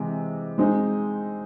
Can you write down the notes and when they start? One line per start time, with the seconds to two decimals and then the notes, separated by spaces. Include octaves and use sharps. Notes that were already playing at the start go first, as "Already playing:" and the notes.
Already playing: C3 E3 G#3
0.58 G#3 C4 D#4 G#4